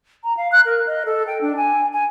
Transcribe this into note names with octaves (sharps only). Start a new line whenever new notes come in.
A#5
F5
F#6
A#4
D#5
A4
G5
D4
G#5
G#5